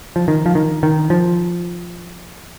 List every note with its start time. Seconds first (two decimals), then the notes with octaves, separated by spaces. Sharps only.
0.16 F3
0.28 D#3
0.46 F3
0.55 D#3
0.83 D#3
1.10 F3